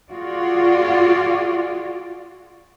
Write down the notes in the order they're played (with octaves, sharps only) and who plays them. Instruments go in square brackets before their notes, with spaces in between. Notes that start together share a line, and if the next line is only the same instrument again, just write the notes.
[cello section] F4 F#4 G#4 D5